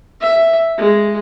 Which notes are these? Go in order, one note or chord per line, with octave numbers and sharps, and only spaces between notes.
E5
G#3